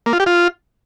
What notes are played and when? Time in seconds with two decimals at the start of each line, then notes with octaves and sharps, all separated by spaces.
0.06 A#3
0.13 F4
0.20 G4
0.26 F4